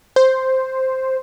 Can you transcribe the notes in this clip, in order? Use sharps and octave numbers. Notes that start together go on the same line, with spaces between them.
C5